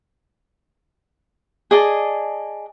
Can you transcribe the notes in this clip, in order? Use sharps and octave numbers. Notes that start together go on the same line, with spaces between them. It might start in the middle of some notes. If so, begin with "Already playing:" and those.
G#4 D5 D#5 A5